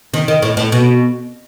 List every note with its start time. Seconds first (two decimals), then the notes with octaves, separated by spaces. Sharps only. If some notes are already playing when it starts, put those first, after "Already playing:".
0.14 D#3
0.28 D#3
0.42 A2
0.57 A2
0.72 B2